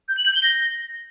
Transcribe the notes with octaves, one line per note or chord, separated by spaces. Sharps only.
G6
F#7
G6
G7
A#6